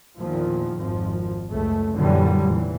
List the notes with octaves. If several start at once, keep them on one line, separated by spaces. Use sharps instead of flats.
E2 A#2 D#3 F3
G#1 F2 F3
C#2 F#2 A3
F#2 A#2 D3 E3 F#3 G3
F1 A#2 E3